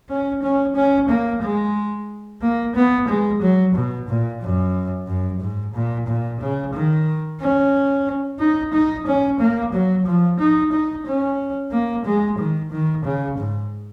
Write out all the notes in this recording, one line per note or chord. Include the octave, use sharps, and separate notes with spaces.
C#4
C#4
C#4
A#3
G#3
A#3
B3
G#3
F#3
B2
A#2
F#2
F#2
G#2
A#2
A#2
C#3
D#3
C#4
D#4
D#4
C#4
A#3
F#3
F3
D#4
D#4
C#4
A#3
G#3
D#3
D#3
C#3
G#2